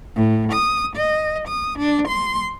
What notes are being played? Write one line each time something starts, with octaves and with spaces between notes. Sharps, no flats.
A2
D#6
D#5
D#6
D4
C6